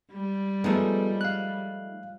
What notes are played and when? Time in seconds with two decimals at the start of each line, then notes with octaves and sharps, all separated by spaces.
0.13 G3
0.64 F3 G#3 A3 B3 D#4 A4
1.21 F5 F#6